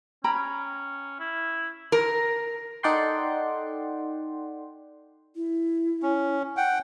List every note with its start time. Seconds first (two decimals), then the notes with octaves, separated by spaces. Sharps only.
0.24 C#4 G5 A#5 B5
1.20 E4
1.92 A#4
2.83 D#4 A4 D5 F#5 G5 C6
5.36 E4
6.03 C#4
6.57 F#5 G5